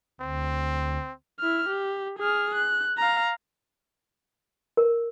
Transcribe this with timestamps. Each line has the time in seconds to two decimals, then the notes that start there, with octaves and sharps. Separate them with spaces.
0.21 D2 C4
1.40 E4 F6
1.69 G4
2.19 G#4 F6
2.55 F#6
2.98 F5 A#5
4.77 A#4